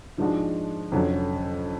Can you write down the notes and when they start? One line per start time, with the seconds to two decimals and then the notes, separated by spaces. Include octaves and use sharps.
0.18 G#2 F3 G#3 D4 F#4
0.92 F1 F2 D3 F#3 C#4